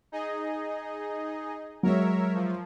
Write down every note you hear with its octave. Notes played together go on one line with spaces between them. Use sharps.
D#4 G#4 D#5
F#3 G#3 A#4 C#5 E5
F3